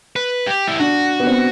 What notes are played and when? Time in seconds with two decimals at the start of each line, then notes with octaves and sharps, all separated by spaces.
0.16 B4
0.47 G4
0.68 E4
0.79 D4 F#4
1.20 B3
1.27 C4